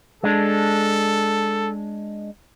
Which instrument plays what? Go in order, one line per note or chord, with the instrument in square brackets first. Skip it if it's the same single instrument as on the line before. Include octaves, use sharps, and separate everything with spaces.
[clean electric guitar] G#3 D4 [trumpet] A4